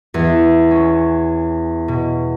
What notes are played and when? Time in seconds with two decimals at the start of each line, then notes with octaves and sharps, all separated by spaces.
0.14 E2
0.71 C#4
1.88 B2